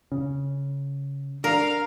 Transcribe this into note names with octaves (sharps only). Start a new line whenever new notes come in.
C#3 C#4
D4 A#4 F5